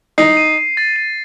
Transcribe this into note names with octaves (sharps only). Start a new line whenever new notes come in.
D#4 C7
D#7
C7
A6
D#7